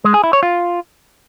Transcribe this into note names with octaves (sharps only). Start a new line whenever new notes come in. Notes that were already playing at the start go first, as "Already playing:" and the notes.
G#3
G#4
E4
C#5
F4